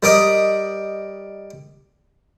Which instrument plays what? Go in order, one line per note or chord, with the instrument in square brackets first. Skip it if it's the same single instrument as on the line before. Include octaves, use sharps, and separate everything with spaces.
[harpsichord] G3 A#4 D5 D#5